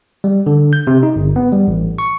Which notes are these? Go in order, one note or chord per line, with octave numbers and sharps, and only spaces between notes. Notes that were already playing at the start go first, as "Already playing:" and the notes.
G3
D3
G6
C3
D#4
G1
B3
G3
A1
C#6